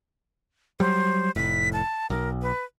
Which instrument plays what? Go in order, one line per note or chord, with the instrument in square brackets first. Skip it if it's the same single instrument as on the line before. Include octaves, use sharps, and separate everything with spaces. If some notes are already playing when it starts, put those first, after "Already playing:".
[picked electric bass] F#3 G3 [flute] C5
[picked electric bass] F1 A2 [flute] B6
[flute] A5
[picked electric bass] B1 [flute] A#4
[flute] B4